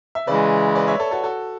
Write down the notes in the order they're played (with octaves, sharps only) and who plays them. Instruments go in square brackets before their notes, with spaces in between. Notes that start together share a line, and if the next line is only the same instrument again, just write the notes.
[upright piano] E5
[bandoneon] C#3 E3 G#3 [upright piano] B4 D5
[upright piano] B4 D5
C#5 E5
A4 C#5
F#4 A4
F#4 A4